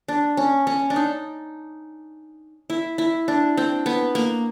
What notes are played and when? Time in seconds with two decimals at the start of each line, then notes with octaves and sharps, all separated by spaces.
0.08 D4
0.37 C#4
0.67 C#4
0.90 D4
0.96 D#4
2.70 E4
2.98 E4
3.28 D4
3.57 C4
3.86 B3
4.15 A#3